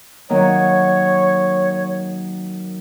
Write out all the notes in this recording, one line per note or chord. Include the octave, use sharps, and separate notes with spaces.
D#3 F#3 A#3 C#5